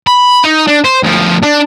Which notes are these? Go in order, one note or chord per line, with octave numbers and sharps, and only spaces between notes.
B5
D#4
D4
C5
D2 F3
D4